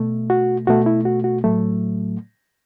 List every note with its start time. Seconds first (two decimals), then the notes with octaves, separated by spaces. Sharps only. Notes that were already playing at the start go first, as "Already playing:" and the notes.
Already playing: B2 A3
0.30 F#4
0.67 B2 A3 F#4
0.86 E4
1.05 F#4
1.24 F#4
1.44 A2 F#3 A3